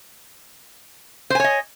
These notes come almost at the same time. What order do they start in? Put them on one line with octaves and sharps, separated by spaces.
C5 G#5 C#5 D#5